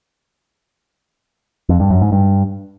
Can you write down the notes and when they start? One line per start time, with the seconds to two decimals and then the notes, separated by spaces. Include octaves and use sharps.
1.69 F2
1.80 G2
1.91 F#2
2.01 G#2
2.12 G2